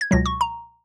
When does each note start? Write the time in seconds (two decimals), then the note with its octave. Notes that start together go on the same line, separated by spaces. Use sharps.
0.01 G#6
0.11 C#2 B2 F#3 A#6
0.26 C#6
0.41 A#5